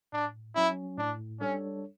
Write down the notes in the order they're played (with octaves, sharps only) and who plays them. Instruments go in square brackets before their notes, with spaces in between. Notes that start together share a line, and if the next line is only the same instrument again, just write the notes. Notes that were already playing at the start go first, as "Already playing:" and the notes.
[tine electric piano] A2 [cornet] D4
[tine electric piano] F#3 C#4 [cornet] E4
[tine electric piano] A2 [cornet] D4
[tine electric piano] G3 D4 A4 C#5 [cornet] C#4